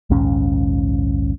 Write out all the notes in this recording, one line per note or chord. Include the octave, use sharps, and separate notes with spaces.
A#1 D#2 G#2 C#4